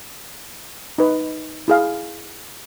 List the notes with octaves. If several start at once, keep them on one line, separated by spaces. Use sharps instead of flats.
D#4 B4
E4 G#4 F5